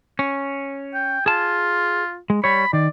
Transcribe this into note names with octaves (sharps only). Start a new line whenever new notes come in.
C#4
G5
F4 G#4 A5
G#3
G3 C#5 B5
D#3 D5